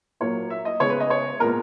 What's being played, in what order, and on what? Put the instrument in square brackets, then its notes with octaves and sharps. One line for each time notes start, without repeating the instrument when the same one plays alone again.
[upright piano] A#2 F#3 A#3 C#5
E5
D#5
C#3 G#3 B3 C#5
B4
D#5
C#5
A#2 G#3 B3 A#4